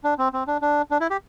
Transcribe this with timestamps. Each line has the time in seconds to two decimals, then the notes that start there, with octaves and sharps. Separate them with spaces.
0.04 D4
0.18 C4
0.33 C4
0.47 D4
0.62 D4
0.91 D4
1.01 E4
1.10 G4